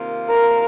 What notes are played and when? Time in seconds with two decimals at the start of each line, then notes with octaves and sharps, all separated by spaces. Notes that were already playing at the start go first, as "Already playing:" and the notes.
Already playing: C3 D#3 A#3 F4
0.29 A#4